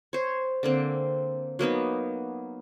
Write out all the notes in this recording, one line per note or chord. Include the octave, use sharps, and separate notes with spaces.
C5 C#5
D3 A#3 C4
F#3 A#3 B3 D#4